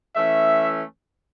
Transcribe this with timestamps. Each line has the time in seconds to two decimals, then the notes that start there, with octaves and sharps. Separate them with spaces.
0.16 E3 A3 C#4 E5